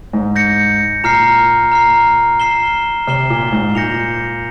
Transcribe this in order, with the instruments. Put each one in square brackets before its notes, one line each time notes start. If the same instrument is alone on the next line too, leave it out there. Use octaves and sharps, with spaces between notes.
[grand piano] G#2
[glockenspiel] G6 A#6 C#7
[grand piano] A#2 [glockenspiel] A#5 F6 C7
[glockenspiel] A#5 F6 C7
F6 C7 E7 G7
[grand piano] C3 [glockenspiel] F6 C7 E7 G7
[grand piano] A#2
G#2
[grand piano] A#2 [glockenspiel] G6 A#6 C#7 F7